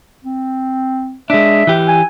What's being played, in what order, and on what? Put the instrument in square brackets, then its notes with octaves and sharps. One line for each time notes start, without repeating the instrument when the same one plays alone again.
[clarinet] C4
[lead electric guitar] G#3 D4 [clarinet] E5
[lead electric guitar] E3 G4
[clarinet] G#5